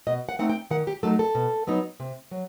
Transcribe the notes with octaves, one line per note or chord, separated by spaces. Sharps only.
B2 D#5
F#5
A3 C4 D#4 F#5
G5
D#3 F#5
G4
F#3 A3 D#4 A4
A4
B2
F#3 B3 D#4
C3
F#3